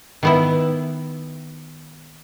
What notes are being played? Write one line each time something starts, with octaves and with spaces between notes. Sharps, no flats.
D#3 B3 E4